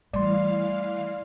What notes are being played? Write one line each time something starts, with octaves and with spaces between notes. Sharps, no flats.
E3 G3 A3 D5 F5 C6